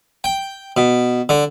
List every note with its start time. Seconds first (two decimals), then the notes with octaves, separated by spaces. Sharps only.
0.24 G5
0.77 B2
1.29 D3